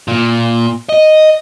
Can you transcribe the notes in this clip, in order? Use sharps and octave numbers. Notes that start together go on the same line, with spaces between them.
A#2
D#5